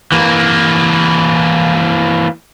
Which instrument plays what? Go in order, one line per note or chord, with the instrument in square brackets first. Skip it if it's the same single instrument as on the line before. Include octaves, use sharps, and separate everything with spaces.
[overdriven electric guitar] E3 A#3